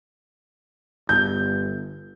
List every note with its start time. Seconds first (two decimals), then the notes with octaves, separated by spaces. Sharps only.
1.09 G1 G6